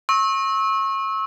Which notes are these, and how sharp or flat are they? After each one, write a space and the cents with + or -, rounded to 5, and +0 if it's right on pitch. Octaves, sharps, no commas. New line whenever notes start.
C#6 -30 E6 -30